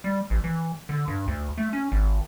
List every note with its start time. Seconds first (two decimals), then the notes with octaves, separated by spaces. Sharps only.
0.04 G3
0.30 A1
0.44 E3
0.89 D3
1.08 G2
1.27 D2
1.58 A3
1.73 C#4
1.92 G#1